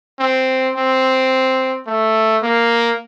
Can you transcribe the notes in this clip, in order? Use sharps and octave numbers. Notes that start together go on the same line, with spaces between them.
C4
C4
A3
A#3